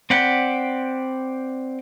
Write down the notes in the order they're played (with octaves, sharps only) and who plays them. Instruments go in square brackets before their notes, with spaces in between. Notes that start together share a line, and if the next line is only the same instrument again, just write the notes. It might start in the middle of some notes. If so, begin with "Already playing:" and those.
[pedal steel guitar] C4 D5 F#5 G5 B5